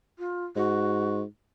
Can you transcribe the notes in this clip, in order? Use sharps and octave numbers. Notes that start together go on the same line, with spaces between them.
F4
G#2 F#4